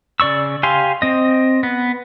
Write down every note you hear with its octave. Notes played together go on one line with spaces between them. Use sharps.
C#3 D5 C#6 E6
G4 F5 G#5 C6
C4 D#5
B3